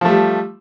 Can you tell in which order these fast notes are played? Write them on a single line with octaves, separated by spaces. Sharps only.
F3 A3 G3